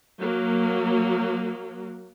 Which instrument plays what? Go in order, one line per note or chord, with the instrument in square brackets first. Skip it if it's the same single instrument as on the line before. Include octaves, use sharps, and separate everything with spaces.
[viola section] F#3 A#3